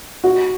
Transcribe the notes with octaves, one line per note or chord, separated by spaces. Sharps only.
F#4